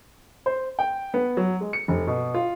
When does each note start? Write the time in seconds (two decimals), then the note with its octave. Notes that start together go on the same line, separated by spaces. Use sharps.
0.46 C5
0.79 G5
1.14 B3
1.37 F#3
1.61 G#3
1.73 C#7
1.88 F1
2.07 B2
2.34 F4